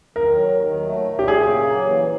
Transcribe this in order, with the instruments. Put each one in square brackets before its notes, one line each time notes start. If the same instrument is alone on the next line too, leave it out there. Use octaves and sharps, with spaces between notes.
[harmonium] D#3 [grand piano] A#4
[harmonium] F#3
D#2
D#3
F#3
A3
A#2
[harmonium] A#2 [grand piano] G4
[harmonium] F#3 [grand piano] G#4
[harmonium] C#3
A#3
F#3
E3